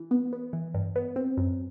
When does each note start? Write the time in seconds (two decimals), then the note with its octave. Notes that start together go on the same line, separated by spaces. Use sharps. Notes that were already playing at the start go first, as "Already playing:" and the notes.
Already playing: E3
0.11 B3
0.33 B3
0.53 E3
0.74 G2
0.96 B3
1.16 C4
1.37 F#2